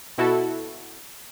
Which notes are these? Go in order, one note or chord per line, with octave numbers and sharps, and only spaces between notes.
B2 E4 F#4 A4